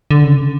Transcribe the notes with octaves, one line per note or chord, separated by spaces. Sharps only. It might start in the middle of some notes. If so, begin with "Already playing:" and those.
D3
C#3